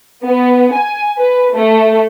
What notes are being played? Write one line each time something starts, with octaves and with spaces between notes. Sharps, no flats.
B3
G#5
B4
A3